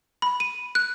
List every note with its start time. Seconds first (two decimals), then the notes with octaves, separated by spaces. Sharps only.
0.22 B5
0.40 D#7
0.75 F#6